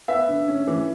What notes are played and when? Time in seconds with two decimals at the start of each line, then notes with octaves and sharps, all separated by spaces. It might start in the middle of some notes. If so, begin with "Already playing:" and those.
0.08 B3 E5
0.28 D3
0.48 C#4
0.67 E3